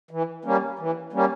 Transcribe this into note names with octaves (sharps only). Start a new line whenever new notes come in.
E3
G3 A#3 C#4
E3
G3 A#3 C#4